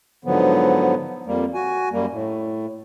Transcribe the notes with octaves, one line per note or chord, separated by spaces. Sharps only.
G#2 D3 F3 F#3 B3
F2 G3 A#3
F#4 G#5
F#2 G3 A#3
A2